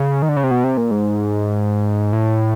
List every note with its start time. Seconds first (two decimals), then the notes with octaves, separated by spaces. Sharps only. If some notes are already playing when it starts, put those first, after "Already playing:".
Already playing: C#3
0.22 D#3
0.29 D3
0.36 C#3
0.44 C3
0.51 B2
0.64 C3
0.77 A#2
0.91 G#2
2.13 A2